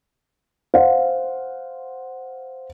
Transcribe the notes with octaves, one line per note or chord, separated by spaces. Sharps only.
C5 F5 F#5